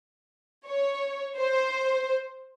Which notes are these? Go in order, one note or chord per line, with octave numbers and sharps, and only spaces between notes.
C#5
C5